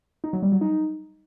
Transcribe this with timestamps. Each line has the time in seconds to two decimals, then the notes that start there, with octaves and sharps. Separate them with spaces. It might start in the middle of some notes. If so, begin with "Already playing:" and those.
0.24 D#4
0.33 F#3
0.42 G3
0.52 F#3
0.61 D#4